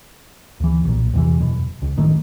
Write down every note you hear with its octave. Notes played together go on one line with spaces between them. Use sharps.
D2 E3
B1 A#2
E2 C3 E3
E1 F#2 B2
C#2
F#1 A2 D#3 A3